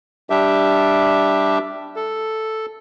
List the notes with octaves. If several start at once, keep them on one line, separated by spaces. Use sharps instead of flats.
G3 D4 G4 E5
A4